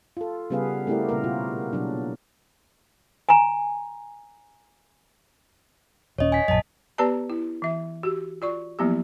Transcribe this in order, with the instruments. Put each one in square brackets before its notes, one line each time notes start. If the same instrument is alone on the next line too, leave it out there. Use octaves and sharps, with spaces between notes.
[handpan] F4 A4
C#3 G3 B3 G#4 B4 F5
A3 C4 E4 G4 A#4 D5
A#2 C#3 G3 A#3 A#4
B2 F4 F#4
B2 F#3 D4
[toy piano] G#5 A#5
[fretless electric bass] D#1 C#4 [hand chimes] C#5 D#5
[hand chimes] G#5 B6
[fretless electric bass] A#1 F#2 [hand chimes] D#5 A5
[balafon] B3 G4 B4 D5 A5 A#5
E4
E3 E5
F#4 G4
F4 D5 C#6
F3 F#3 A#3 B3 E4 G4